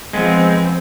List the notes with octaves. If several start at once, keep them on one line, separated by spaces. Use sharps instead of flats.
F3 G#3 B3 C4